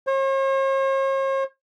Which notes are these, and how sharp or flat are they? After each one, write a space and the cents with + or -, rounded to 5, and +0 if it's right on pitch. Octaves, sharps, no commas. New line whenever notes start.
C#5 -45